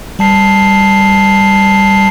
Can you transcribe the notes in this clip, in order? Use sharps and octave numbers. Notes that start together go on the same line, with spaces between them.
G3 A5 C7